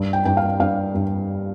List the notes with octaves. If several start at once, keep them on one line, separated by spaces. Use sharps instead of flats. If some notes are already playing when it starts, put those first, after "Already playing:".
Already playing: G2
G5
G2 G5
F5
G2 F5
G2